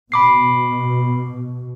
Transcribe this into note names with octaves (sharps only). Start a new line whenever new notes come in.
B2 B5 D6 C7